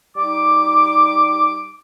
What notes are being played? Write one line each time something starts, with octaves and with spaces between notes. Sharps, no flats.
G3 D#4 D6